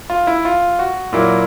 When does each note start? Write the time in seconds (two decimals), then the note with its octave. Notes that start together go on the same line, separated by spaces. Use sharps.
0.10 F4
0.27 E4
0.45 F4
0.79 F#4
1.13 A#2 F#3 A#3 E4